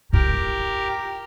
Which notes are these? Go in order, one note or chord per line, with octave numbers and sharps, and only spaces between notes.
E4 F4 G4 A#4